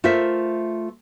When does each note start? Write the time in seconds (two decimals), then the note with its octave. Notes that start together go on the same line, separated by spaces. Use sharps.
0.04 A3 F4 A#4 C5 E5